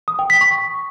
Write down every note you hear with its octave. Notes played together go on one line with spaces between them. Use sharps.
D#6
G5
B6
C#6